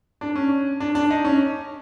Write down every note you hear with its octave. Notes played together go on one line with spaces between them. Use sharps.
D4
C#4
D4
D4
D#4
C#4